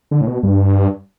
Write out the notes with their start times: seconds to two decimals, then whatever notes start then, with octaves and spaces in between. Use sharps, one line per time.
0.11 D3
0.21 A2
0.27 B2
0.43 G2